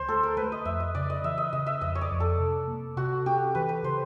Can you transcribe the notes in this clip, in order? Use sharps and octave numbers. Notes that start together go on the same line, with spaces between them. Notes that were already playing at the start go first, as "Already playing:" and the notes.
Already playing: D2 C5
A3 A4
A#4
A3 B4
D#5
F2 E5
D#5
C#3 D5
D#5
E3 E5
D#5
C#3 D#5
E5
F2 D#5
C#5
D5
F2
A4
C3
A#3
C3 F#4
C#4 G4
E3 B4
B4
C#3 C5